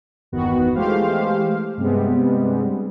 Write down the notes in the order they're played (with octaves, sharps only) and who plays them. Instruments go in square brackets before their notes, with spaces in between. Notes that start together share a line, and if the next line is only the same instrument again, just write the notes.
[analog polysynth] G1 E2 D#3 B3 F#4
E3 G#3 A3 G4 C5 F5
G2 C3 G3 G#3 B3 C4